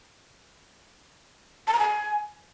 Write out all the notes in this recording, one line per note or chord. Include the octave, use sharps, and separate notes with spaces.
A5
A#5
G#5